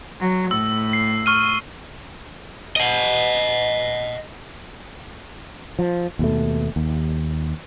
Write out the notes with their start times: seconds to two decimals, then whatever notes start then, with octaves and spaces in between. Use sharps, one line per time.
0.19 F#3
0.51 A2 E6
0.93 C7
1.26 C#6 F6 D#7
2.76 D#5 F#5
5.79 F3
6.19 D#2 B2 A3
6.76 D#2